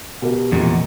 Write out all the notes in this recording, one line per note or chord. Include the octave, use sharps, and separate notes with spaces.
B2 G4 A#4
F1 E2 A#2